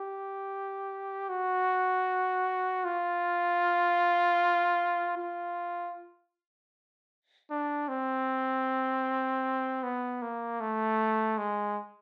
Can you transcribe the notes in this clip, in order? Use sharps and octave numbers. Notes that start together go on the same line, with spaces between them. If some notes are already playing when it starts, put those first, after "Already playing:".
Already playing: G4
F#4
F4
F4
D4
C4
B3
A#3
A3
G#3